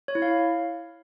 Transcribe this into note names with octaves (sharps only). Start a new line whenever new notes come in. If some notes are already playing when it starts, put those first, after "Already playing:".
C#5
E4
F5